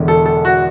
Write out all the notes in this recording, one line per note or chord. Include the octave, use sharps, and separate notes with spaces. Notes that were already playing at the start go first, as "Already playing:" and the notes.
Already playing: E1 E2 D3
A4
A4
F#4